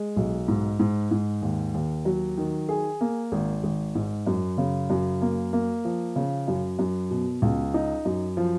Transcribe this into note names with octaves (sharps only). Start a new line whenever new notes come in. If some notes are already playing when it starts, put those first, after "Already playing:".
Already playing: G#3
B1
G#2
G#2
G#2
D#2
D#2
F#3
D#3
G#4
A#3
G#1
G#1
G#2
F#2
C#3
F#2
A#3
A#3
F3
C#3
F#2
F#2
B2
C#2
D#4
F#2
F3